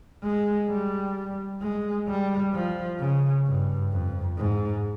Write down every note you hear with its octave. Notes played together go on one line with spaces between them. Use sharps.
G#3
G3
G#3
G3
F3
C#3
G2
F2
G#2